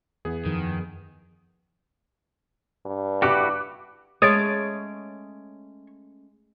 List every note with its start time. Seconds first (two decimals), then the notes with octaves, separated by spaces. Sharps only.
0.25 E2 E3 B3 G#4
0.45 F#2 D#3 F3
2.86 G2
3.22 E4 F#4 G4 D6 F#6
4.22 G#3 A3 C#4 C#5 D#6 A6 D7